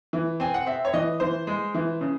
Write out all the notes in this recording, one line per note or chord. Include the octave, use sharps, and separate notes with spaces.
E3
C4 G#5
F#5
C4 E5
C#5
E3 D#5
E3 C5
G#3
E3
C#3